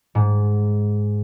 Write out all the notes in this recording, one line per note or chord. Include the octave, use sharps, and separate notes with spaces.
G#2